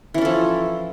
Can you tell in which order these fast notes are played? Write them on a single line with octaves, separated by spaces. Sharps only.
E3 C#4 A4 F3